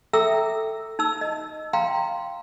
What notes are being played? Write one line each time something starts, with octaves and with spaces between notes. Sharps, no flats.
A4 E5 G5 A#5 D6 E6
D#4 A5 E6
D#5 A5
F5 G5 A#5 C6